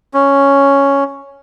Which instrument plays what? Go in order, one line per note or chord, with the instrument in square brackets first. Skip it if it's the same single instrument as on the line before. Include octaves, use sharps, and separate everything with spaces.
[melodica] C#4